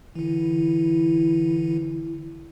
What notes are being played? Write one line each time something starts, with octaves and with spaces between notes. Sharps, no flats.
D3 E3 E4